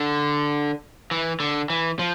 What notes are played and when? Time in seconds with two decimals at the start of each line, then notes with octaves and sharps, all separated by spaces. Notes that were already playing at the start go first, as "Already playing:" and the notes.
Already playing: D3
1.11 E3
1.40 D3
1.70 E3
1.99 F3